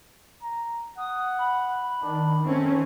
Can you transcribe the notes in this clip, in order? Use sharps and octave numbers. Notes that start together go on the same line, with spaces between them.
A#5
F#5 D#6
B5
D#3 D4
A3 C4 C#4